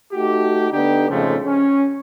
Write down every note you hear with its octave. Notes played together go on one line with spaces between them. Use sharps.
A3 D#4 F#4 G4
D3 B3 D4 D#4 G4
F2 G#2 C#3 F3 G#3 A3
C#4